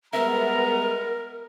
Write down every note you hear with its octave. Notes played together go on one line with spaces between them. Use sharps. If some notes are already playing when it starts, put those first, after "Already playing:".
G3 G#3 B3 A#4 E5 A#5